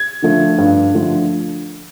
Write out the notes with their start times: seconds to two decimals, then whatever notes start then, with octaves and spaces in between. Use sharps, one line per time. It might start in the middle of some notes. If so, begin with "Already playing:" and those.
Already playing: G#6
0.22 D3 F3 A3
0.58 G2
0.94 D3 F3 A3